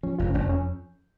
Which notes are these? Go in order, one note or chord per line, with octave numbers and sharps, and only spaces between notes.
F3 C#4
F1 F4
C#4
F1 D4
F2 C#4